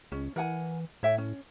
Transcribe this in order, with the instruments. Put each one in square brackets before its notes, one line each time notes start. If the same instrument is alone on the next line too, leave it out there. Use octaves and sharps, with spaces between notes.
[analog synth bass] C#2 [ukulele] C#4
[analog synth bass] E3 [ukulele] A#4 F#5 G#5
[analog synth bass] A2 [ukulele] C#5 E5 G5
[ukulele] C#4